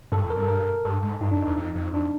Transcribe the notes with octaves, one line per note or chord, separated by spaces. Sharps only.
G2 A4
F2 A4
A#4
G2
A4
A#4
A#4
G2 A4
G#2
G2 D#4
F#2 D4
E2 D#4
F2
F2
F2 D4